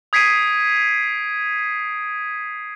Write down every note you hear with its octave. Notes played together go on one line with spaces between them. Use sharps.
D#6 G#6 B6 C7 D7 D#7